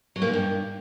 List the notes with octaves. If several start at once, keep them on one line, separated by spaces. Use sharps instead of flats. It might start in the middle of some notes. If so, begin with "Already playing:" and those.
F#3
A#3
G#2
G2